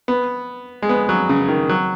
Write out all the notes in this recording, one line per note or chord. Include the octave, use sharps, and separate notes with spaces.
B3
G#3
B3
F#3
C#3
D#3
F#3